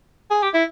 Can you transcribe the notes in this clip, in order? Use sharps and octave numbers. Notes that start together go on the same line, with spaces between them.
G#4
G4
E4